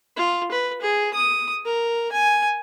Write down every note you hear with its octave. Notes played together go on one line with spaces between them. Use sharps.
F4
B4
G#4
D#6
A#4
G#5